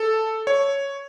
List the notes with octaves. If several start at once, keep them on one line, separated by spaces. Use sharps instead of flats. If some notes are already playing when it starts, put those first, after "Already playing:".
Already playing: A4
C#5